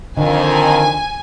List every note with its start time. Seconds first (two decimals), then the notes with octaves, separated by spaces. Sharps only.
0.17 F2 D3 D#3 G#5